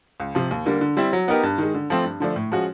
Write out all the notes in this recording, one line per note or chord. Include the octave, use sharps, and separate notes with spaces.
C#2
C3 F3
D#2
D3 G3 A#3
D3
G3 C4 E4
F#3
B3 D#4 G4 A#4
G2
D#3 G#3
D3
F3 A3 C4
G2
D3 F3 A3 D4
A2
F3 G#3 C#4 F#4